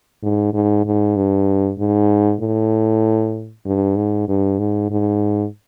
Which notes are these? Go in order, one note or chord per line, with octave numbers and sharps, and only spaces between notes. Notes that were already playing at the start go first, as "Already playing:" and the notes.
G#2
G#2
G#2
G2
G#2
A2
G2
G#2
G2
G#2
G#2